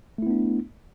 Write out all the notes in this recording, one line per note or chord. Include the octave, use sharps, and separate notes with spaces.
A3 B3 D4 E4